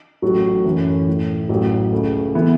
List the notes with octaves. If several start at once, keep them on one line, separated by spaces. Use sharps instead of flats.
A1 A2 F#3 A3 F#4
F#2 E3 A3 C#4
A2 A3 E4
A1 A2 F#3
C#2 C#3 A3
E3 B3 E4